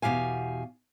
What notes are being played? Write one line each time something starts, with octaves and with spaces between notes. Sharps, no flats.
E2 B2 E3 G4 F5 G#5